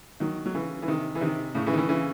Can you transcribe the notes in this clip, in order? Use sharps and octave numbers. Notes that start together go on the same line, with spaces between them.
D#3 F#3
F#3
C#3 E3
E3
C3 D#3
E3
C3 D#3
A2 C#3
C#3 E3
D#3
C#3 E3
C#3 E3